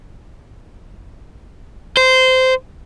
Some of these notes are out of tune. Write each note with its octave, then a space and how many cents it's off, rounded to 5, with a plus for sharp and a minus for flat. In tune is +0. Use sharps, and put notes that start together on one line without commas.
C5 -15